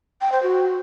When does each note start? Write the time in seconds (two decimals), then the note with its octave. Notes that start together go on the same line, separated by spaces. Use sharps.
0.21 G5
0.32 C5
0.43 F#4